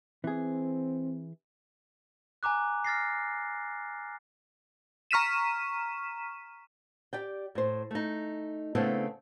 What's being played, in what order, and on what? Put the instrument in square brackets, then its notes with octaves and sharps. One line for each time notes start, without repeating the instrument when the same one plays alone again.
[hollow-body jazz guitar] E3 G#4 [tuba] C4
[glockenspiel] G#5 A#5 D6 F#6
F6 A6 A#6 C7
[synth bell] A#5 C#6 F6 B6 D#7 E7
[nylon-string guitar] G4 D5 G5
A2 C5
A3 D#4
C#3 A3 B3 C4 D4 E4